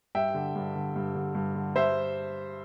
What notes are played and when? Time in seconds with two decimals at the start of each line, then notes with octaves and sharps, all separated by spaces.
0.15 G2 E5 G5
0.34 D3
0.56 G2
0.75 D3
0.96 G2
1.15 D3
1.35 G2
1.55 D3
1.75 G2 C5 E5